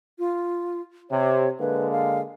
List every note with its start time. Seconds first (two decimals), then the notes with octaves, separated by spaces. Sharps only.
0.19 F4
1.10 C3 C#5
1.60 D3 G#3 A#3 B4
1.92 F5